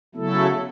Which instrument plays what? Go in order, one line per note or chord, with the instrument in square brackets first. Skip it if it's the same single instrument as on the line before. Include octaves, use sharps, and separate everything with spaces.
[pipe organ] C#3 F#3 A3 E4 A4 [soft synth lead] B3